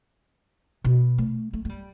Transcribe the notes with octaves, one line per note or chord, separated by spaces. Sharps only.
B2
A3
A3
A3
G3